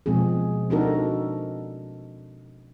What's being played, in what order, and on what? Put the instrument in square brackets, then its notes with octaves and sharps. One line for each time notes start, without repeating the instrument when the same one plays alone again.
[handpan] B2 F3 G#3 C4 G#4
C4 D4 D#4 F#4 A4 A#4